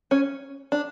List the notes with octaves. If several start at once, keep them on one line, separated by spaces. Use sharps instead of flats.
C#4
D4